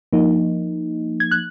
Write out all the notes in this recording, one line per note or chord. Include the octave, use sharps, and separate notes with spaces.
F3 A#3 D#4
G#6
F#6